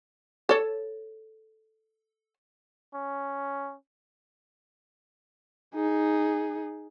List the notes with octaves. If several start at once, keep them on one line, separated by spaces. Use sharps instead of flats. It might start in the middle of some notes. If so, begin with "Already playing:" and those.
A4 C#5
C#4
D#4 G#4